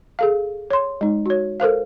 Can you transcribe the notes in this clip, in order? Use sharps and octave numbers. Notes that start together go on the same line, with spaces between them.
G#4 A4 F5
C#5 C6
G#3 D#4
F#4 C#5
A4 A#4 C5 F5